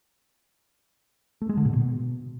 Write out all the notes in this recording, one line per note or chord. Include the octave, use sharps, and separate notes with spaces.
A3
G#3
D3
A#2
B2